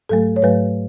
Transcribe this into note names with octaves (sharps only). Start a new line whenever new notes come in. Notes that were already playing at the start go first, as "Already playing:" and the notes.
G#2 F#3 A3 A4
C#5
G#2 F#3 A3 B4